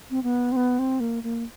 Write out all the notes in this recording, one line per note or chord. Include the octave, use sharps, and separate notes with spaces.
C4
B3
C4
B3
C4
A#3
A#3